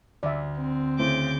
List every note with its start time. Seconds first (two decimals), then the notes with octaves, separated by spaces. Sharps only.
0.23 D2 D5 E5
0.57 C4
0.99 C#3 A3 E4 C5 D6 G6